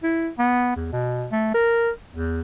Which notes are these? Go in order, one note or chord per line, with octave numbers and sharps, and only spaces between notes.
E4
B3
E2
B2
A3
A#4
E2